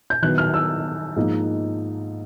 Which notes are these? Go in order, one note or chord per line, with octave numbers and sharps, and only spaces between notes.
G6
D#3 F#3 B3 E4 F#6
F6
E6
G#2 F3 A#3 D#4